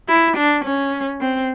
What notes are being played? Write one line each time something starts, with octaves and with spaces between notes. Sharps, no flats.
E4
D4
C#4
C4